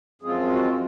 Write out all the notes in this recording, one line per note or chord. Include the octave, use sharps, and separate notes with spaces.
F#2 F3 G#3 C4 F4 G#4
F#4